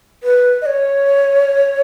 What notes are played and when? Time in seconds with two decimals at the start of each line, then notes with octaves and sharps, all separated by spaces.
0.23 B4
0.62 D#5
0.66 C#5